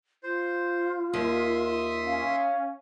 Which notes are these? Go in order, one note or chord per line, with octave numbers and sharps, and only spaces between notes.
F4 C5
D#2 E5 C6 D#6
C#4 F5